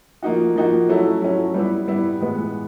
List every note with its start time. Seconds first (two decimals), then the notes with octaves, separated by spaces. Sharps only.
0.23 F3 A#3 D#4 F#4
0.56 F3 A#3 D#4 F#4
0.89 F#3 A3 C#4 E4
1.22 F#3 A3 C#4 E4
1.54 G3 B3 E4
1.88 G3 B3 E4
2.20 A2 E3 G#3 B3